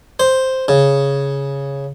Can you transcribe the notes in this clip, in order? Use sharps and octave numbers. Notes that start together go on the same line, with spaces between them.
C5
C#3